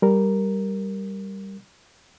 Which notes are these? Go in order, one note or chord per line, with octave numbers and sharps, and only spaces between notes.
G3 A#4